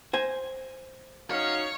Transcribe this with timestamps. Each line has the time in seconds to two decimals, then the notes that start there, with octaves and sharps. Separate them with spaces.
0.13 C5 G#5
1.31 F#3 C#4 D#4 C#5 F5